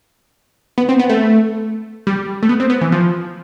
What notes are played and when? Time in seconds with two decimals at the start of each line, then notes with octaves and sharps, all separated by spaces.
0.78 B3
0.89 C4
0.99 B3
1.09 A3
2.07 G3
2.43 A3
2.49 B3
2.60 C4
2.70 B3
2.81 E3
2.92 F3